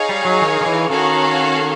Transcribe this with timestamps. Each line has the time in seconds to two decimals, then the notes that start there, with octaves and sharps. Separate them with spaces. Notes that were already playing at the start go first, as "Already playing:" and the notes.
Already playing: D#4 G#4 C#5 F5
0.09 G3
0.25 F#3
0.41 D#3
0.61 D#3
0.66 E3
0.90 D#3 C#4 F#4 A4 C#5 F5